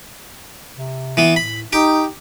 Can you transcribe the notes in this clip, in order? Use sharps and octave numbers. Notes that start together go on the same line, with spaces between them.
C3
E3 B3
A2 B5
D#4 G4 G5